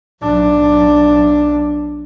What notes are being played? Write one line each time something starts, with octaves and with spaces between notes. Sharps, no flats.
B1 D4